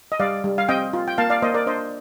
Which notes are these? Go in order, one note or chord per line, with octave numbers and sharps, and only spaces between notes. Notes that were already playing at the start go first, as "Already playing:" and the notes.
D#5
G3 D5 F5
G3
F5
C4 D#5 G5
F4
G5
A#3 F5 A5
D5 F5
A#3 C5 D#5
A#4 D5
D4 C5 D#5